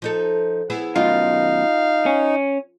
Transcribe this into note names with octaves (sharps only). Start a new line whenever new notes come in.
F3 D#4 A4
B3 E4 G#4
F#2 B2 D#3 D#4 F4 F5
C#4